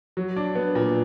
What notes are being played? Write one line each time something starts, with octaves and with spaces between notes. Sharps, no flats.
F#3
D4
B3
A#2